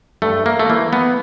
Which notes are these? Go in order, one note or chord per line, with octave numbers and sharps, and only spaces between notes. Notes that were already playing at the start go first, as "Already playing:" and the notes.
G2 A3
A#3
A3
E3 A#3
B3